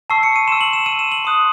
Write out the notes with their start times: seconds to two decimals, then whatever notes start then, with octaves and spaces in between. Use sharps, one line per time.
0.10 A5 C#6 E6 C7
0.23 C#7
0.36 D#7
0.48 C6 E6 E7
0.61 F#7
0.73 E7
0.86 C6 E6 D#7
0.99 E7
1.12 F#7
1.25 C6 D#6 F#6